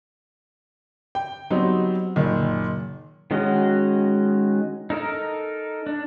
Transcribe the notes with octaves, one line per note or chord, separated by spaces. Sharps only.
G5
F#3 G3 B3 C4 D#4
F#1 A#2 D#3
D#3 G#3 C#4 F#4 D#5
D#4 A4 A#4
D4